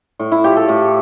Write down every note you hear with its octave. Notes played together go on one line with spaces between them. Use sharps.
A2
E4
F3 A3 G4
A4
A2